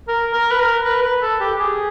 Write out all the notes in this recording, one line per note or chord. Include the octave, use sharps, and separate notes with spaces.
A#4
A#4
B4
A#4
B4
B4
A4
G4
G#4